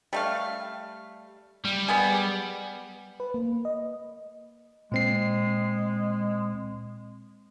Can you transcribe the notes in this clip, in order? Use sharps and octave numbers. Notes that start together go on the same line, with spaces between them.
G3 A3 F5
G3
B3 G#4
B4
A#3
D#5
A#2 G#3 C4 C7